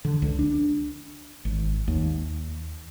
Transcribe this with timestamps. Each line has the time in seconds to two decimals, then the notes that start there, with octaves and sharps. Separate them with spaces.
0.05 D3
0.22 C#2
0.39 D4
1.45 G#1
1.88 D#2